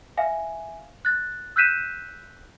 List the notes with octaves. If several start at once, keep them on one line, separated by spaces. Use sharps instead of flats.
E5 F5 G#5
F#6 A6
E6 F#6 G6 B6 D#7 E7